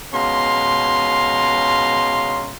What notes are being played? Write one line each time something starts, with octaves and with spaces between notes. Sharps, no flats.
B2 G#3 C#4 F5 A#5 C6